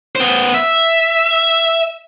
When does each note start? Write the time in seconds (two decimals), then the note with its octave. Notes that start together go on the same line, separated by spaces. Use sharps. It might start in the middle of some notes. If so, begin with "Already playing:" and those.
0.16 B3 C5
0.54 E5